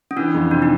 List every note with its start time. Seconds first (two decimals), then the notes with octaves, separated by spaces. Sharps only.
0.11 C#4
0.16 E3 D4
0.34 F2
0.51 C3 D4
0.62 D#4